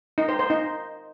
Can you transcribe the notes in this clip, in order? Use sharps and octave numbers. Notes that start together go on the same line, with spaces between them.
D#4
C5
C5
D#4